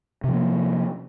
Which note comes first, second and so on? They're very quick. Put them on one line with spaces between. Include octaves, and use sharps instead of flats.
C3 F3 A#3